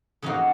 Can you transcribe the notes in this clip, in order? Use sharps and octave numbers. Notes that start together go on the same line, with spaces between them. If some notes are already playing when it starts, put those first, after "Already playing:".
F2 C#3 F3 A#3 D#4 F#4